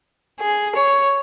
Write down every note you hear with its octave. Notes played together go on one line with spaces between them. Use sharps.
G#4
C#5